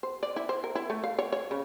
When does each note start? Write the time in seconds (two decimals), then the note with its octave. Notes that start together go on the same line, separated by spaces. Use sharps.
0.03 C5
0.23 D5
0.36 E4
0.49 C5
0.64 A#4
0.75 E4
0.90 A3
1.04 F5
1.19 C#5
1.32 C#5
1.51 C#3